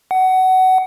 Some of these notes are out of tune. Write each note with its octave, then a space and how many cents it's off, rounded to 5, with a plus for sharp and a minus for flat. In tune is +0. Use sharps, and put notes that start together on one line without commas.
F#5 +20